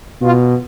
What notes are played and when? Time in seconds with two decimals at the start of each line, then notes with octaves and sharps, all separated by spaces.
0.21 B2 F4